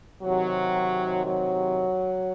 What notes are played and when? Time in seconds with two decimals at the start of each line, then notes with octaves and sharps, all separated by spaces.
0.23 C3 D#3 F#3
1.25 F#3